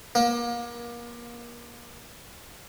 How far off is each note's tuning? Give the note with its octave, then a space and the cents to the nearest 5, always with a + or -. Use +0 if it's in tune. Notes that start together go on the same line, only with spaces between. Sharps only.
A#3 +30